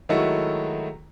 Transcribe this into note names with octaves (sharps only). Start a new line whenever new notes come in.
D#3 F#3 G#3 A3 E4 F#4